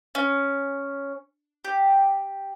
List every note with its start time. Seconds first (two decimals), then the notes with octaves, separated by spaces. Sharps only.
0.15 C#4
1.64 G4